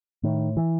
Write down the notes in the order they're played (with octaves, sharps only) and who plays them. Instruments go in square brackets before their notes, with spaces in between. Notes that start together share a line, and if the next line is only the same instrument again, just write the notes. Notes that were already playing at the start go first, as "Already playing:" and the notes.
[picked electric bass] A2 D#3
E3